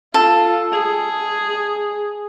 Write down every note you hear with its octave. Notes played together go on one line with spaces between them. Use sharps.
F4 A4
G#4